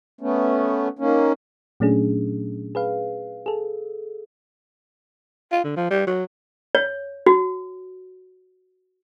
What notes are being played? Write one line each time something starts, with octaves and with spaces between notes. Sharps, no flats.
A3 B3 C#4
D#3 A#3 C#4
A#2 F#3 A3 C#4 D4 G#4
G#4 B4 F5
G#4 A4
F4
D3
F3
G3
F#3
C#5
F#4